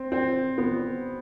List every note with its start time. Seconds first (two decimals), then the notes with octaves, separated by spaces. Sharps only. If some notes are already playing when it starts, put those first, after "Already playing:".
Already playing: C4
0.12 C4
0.58 B3